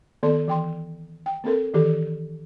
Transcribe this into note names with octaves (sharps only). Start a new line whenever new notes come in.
D#3 A#3 B3 A4 D5 C6
E3 G5 C6
G5
A#3 C4 A4 A#4
D#3 E3 G4 A4